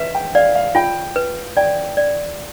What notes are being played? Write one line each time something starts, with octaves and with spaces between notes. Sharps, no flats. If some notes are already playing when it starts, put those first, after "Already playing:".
Already playing: B4 E5
G5
D5 F5
F5
F4 G5
B4
D5 G5
D5